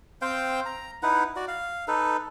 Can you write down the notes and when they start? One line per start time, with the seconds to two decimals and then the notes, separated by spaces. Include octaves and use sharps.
0.22 C4 C5 F5 G5
0.66 A#5
1.03 D#4 E4 B4 F#5
1.36 F#4 D5
1.48 F5
1.88 D#4 A4 B4